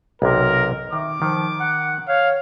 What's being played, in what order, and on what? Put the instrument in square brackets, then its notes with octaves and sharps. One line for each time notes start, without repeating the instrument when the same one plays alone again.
[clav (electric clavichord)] B1 C3 [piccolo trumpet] A#4
[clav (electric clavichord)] D#3 [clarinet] E5 [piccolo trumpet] D6
[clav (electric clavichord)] D#3 [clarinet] F3
[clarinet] F#5
[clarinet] C#5 [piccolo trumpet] F5